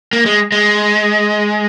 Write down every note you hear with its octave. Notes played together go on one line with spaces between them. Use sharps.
A#3
G#3
G#3